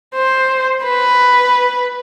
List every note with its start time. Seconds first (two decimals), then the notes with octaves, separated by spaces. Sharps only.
0.15 C5
0.84 B4